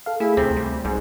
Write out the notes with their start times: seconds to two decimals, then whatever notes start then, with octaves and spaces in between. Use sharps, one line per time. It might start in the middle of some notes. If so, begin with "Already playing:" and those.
0.06 A4 F5
0.20 A3 E4 G#4
0.37 D2 C3 C4
0.56 G3
0.85 B1 G#2